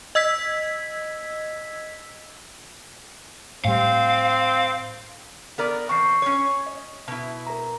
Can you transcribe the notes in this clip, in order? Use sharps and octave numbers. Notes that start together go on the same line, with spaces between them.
D#5 E6 G#6 B6
A2 G3 C4 F5
B3 A#4 D5
E2 C4 C#6 C7
C#4 C#5
D#5
B2 E4
A#4 A#5